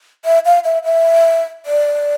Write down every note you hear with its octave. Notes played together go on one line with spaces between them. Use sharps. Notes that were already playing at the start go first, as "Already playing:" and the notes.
E5
F5
E5
E5
D5